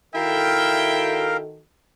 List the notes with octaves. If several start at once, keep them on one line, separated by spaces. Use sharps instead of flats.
D#3 E4 F#4 A4 A#4 E5 F5 G5